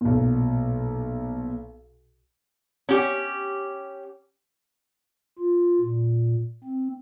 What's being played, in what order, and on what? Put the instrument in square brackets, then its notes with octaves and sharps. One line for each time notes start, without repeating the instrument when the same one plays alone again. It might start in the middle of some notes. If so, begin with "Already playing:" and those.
[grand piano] B1 A#2
[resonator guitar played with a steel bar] C#4 G4
[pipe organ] F4
A#2
C4